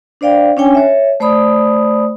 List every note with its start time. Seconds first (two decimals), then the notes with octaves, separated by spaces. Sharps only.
0.21 D4 C5 D5 F5 G5
0.57 C#4 D4 C#5 G5 G#5
0.75 C#5 E5
1.20 A3 C5 D5 B5 D#6